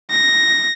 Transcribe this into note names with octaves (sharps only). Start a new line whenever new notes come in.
A#6